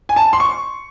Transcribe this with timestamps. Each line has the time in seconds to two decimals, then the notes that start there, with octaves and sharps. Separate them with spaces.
0.09 G#5
0.16 A5
0.33 C6
0.40 C#6